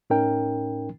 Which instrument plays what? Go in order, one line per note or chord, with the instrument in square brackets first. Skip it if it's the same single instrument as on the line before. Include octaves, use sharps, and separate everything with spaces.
[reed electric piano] A2 C#4 D#4 A#4 G5